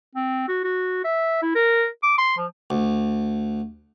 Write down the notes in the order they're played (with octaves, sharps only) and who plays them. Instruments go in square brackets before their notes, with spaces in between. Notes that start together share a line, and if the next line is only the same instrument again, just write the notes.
[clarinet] C4
F#4
F#4
E5
E4
A#4
D6
C6
F3
[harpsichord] D2